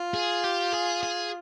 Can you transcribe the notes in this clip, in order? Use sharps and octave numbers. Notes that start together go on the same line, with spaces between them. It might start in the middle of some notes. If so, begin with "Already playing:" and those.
Already playing: F4
G#4
G4
G#4
G#4